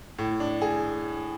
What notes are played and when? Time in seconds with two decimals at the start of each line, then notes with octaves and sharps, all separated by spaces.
0.19 A2
0.40 D4
0.62 G#4